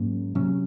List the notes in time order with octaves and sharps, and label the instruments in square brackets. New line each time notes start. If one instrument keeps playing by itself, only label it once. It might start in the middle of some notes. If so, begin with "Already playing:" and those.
Already playing: [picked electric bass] G#2 F#3 A#3 C#4
C3 F#3 C#4